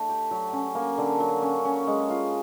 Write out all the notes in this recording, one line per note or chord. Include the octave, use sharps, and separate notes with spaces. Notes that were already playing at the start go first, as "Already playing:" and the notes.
Already playing: A3 D4
G4
F#3
C#4
A#3
D3
F#3
C#4
C#4
G#3
F4